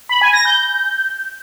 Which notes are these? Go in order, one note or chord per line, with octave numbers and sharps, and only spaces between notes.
B5
G#5
A#6
G6